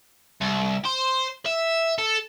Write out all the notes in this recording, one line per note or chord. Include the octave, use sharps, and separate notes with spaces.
C2
C5
E5
A4